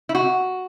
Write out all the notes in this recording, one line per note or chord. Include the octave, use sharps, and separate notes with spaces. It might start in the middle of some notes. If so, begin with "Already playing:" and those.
E4
F#4